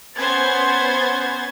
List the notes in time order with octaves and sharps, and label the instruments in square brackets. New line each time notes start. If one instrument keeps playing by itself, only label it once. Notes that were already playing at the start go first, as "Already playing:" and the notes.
[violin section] B3 C#4 C5 G#6 A6